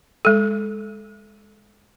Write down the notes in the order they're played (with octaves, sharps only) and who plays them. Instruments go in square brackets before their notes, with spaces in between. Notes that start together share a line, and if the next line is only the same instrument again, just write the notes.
[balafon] G#3 A4